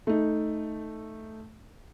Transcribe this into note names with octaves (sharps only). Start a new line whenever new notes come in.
A3 D#4